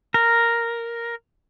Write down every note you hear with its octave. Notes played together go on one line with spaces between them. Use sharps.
A#4